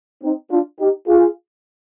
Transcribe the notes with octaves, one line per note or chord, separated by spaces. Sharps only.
C4 D#4
D4 F4
D#4 G4
F4 G#4